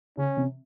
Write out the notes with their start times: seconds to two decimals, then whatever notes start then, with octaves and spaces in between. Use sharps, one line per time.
0.17 C#3 C#4
0.37 C3